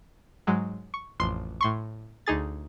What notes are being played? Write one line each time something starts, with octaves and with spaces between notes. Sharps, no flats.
G#2 F#3 G#3
C#6
A1 F2 C6
A2 C6 C#6
D2 D#4 G#4 A6